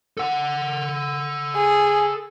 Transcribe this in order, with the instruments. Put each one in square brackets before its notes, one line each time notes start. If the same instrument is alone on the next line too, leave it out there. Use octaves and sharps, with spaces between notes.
[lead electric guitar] A4 F#5
[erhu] G#4